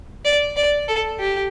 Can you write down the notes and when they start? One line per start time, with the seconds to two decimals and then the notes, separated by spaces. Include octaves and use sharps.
0.25 D5
0.57 D5
0.88 A4
1.20 G4